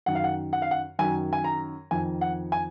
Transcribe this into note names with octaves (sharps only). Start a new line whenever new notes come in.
F#2 D#3 F#5
F5
F#5
F#5
F5
F#5
F#2 D#3 G#5
G#5
A#5
F2 D#3 G#5
F#5
G#5